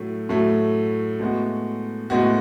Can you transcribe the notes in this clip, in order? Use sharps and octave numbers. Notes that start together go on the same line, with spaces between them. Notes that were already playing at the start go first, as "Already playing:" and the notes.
Already playing: A2 F#3 A3
A2 F#3 A3
A2 G#3 B3 F#4
A2 G#3 B3 F#4